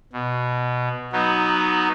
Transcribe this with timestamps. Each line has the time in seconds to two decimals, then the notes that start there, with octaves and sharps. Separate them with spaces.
0.13 B2
1.12 F#3 B3 D#4